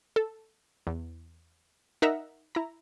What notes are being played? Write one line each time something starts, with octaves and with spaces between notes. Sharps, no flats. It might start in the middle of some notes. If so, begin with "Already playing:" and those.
A4
E2
D#4 A#4 E5 F#5 A#5
E4 A#5